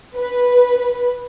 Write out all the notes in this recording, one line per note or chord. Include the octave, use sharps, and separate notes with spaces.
B4